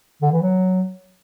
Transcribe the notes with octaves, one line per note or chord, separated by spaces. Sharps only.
D3
E3
F#3